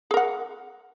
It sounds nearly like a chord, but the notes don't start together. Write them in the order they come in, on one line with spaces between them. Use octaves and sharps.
G#4 A#4 F#5